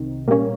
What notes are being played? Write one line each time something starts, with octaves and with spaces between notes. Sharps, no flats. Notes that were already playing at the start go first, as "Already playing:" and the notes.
Already playing: C2 C3 D#3
A#2 G3 A#3 C#4